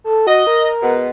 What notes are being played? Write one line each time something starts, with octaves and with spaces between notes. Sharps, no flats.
A4
F#4 D#5
A#4
B2 G#3 B3